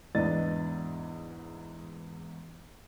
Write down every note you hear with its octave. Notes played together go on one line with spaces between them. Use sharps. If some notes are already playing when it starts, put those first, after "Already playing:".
E2 G#2 B3 D4 D#5 A6